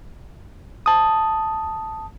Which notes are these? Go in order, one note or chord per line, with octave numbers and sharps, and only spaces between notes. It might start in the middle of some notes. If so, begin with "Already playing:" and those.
A5 D#6